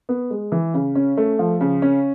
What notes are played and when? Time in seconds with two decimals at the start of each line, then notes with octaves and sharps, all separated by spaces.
0.09 B3
0.31 G#3
0.52 E3
0.74 C#3
0.95 C#4
1.17 A3
1.39 F3
1.61 C#3
1.82 C#4